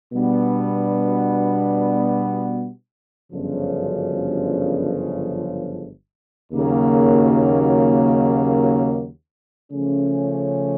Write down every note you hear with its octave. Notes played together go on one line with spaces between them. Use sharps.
B2 G3 B3 D4
G1 F#2 C#3 F3
D#2 C#3 F#3 A#3
C#3 F3 A3 C#4